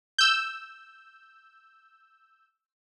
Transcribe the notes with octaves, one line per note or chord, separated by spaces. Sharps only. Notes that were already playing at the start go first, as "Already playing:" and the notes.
E6 G6